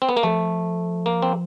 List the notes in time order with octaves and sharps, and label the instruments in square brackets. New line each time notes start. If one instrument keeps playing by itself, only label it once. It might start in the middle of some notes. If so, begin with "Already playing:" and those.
[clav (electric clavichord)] C4
B3
A#3
[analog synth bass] F3 [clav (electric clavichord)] A3
[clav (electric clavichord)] A#3
C4